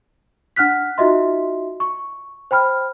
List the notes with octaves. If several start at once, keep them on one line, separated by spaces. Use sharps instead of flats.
D4 F#5 F6 F#6 B6
D#4 F4 F#4 D#5 E5 C6
C#6
C5 G5 B5 F6